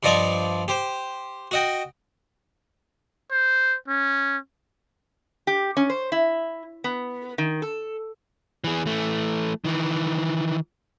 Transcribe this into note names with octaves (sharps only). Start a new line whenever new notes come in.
G2 F3 D5 D#5 C#6 D6
G4 C5
F#4 D#5 G5
C5
C#4
G4
C#4
C5
E4
B3
D#3
A4
E3 G#4
E3 A3
D#3 E3